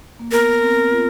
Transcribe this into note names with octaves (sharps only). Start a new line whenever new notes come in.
A#3
B3 A#4
C4
F4